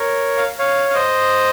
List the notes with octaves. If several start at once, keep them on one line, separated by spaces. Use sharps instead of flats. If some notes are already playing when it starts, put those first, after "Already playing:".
Already playing: A#4 C#5
F5
C#5 F5
F5
C5 D#5